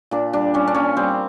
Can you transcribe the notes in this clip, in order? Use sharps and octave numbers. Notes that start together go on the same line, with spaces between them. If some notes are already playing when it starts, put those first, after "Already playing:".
A#2 D4
G3 D4
G3 C#4
D4
A#2 C#4
G3 C4